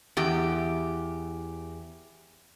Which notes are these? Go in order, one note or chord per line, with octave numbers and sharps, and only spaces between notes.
E2 G4